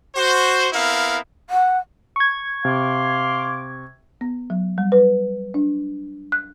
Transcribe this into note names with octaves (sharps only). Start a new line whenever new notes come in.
F#4 C5
B3 C4 E4 A#4 F5
F#5
C#6 G#6
C3 F5 C6 D6
B3
F#3
G3
B4
D4
F#6